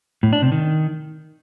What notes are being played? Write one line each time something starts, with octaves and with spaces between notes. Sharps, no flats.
A2
D4
C3
D#3